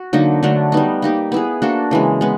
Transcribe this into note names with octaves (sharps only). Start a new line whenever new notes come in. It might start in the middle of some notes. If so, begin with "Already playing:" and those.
Already playing: F#4
D3 F#3 A#3 D#4
D3 F#3 A3 D4
G3 B3 D#4
A#3 D#4 G4
B3 E4 G#4
A#3 D4 F#4 A4
C#3 E3 G#3
G#3 B3